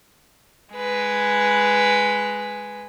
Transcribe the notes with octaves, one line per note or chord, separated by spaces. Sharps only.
G#3 B4